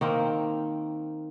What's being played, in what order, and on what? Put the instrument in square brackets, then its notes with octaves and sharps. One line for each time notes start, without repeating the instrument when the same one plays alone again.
[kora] D#3 A#3 C4